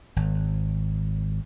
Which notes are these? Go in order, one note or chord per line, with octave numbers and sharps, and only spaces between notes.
G#1